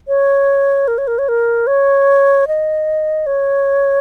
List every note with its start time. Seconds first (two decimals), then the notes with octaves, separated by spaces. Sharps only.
0.08 C#5
0.88 A#4
0.98 C#5
1.07 A#4
1.18 C#5
1.29 A#4
1.67 C#5
2.48 D#5
3.26 C#5